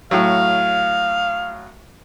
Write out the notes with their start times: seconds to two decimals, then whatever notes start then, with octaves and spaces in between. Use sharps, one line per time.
0.11 A2 F#3 F5